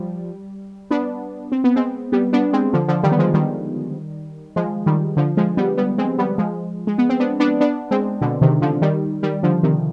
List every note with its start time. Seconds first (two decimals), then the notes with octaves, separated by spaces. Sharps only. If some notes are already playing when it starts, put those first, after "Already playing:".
Already playing: F3 G3
0.91 B3 D4
1.52 C4
1.64 B3
1.76 G#3 C4
2.12 G3 B3
2.33 B3 D4
2.53 G#3 C4
2.73 D3 F3
2.88 D3 F3
3.03 D#3 G3
3.12 B3
3.19 F3 G#3
3.34 D#3 G3
4.56 F3 G#3
4.86 D#3 G3
5.17 D3 F3
5.37 F3 G#3
5.57 G3 B3
5.77 G3 B3
5.98 G#3 C4
6.18 G3 B3
6.38 F3 G#3
6.87 G#3
6.98 B3
7.09 C4
7.20 B3 D4
7.40 B3 D4
7.60 B3 D4
7.91 G#3 C4
8.21 B2 D3
8.41 C3 D#3
8.62 D3 F3
8.82 D#3 G3
9.23 D#3 G3
9.43 D3 F3
9.63 C3 D#3